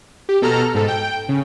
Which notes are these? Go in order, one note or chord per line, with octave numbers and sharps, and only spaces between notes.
G4
B2 A4 A#5 F6
G#2 A4
G5
C#3